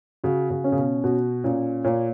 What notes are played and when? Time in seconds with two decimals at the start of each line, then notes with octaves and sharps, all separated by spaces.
0.24 C#3 F#4
0.50 C#3
0.64 C#4
0.72 C#3
0.78 B2
1.04 B2 F#4
1.44 A#2 C#4
1.84 A#2 C#5